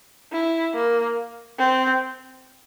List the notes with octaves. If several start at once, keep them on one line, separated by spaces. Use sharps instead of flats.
E4
A#3
C4